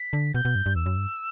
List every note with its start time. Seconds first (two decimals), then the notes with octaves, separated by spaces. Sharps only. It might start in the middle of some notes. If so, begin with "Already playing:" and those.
Already playing: B6
0.13 D3
0.34 B2 G6
0.45 B2
0.55 G2
0.66 G2
0.76 E2 E6
0.86 F#2
0.97 G2